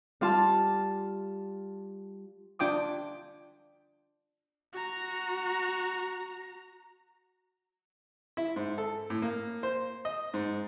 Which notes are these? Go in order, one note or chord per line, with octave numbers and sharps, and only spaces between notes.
G3 F4 A5
D4 F4 G5 D6 D#6
F#4 A#5
E4
G#2
A4
A2
A#3
C5
D#5
G#2